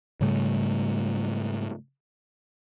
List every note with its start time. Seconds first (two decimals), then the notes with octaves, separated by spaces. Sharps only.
0.21 G#2 C#3 G3 A3